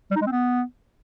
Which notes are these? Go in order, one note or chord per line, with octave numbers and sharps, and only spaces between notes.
G3
D#4
G#3
C4
B3